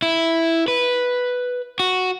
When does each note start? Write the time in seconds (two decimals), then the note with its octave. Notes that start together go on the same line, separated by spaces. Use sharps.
0.02 E4
0.68 B4
1.80 F#4